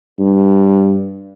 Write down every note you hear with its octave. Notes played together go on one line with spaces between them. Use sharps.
G2